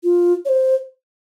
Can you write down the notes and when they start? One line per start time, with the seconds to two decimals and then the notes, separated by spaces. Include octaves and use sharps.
0.04 F4
0.45 C#5
0.49 C5